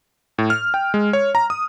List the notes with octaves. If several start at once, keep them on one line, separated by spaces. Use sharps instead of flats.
A2
F6
G5
G#3
C#5
A#5
D#6